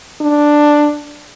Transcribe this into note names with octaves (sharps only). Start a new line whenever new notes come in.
D4